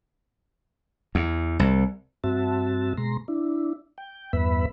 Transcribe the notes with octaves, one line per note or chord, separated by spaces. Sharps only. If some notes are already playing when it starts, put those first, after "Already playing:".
E2
C2
G2 C4 F#4 E5 A5
B2 G#3 A#5 C6
D4 E4
G5
E2 G2 B3 B4 E5 B5